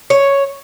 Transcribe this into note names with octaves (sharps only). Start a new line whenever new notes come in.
C#5